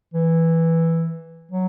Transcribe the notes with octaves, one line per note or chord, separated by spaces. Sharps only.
E3
F#3